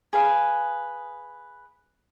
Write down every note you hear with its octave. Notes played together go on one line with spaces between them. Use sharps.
G#4 B4 F5